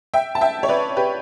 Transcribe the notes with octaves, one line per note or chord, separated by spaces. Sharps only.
E5 G5
A5
E5 G5
C#5
B4 D5
G4 B4